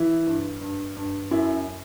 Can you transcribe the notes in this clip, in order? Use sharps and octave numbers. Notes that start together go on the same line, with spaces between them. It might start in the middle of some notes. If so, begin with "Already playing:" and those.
Already playing: E3 E4
G2
G2
G2
F#2 E4